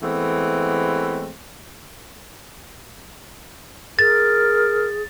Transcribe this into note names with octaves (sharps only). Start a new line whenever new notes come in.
E3 G#3 A3 B3 C4
G#4 A#4 A6